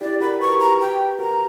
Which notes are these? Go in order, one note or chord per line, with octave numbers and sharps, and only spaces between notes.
E4 G4 D5
F#4 A#4 B5
B4 C#6
A#4
G4 B4 A#5
G5
F#4 A#4 A#5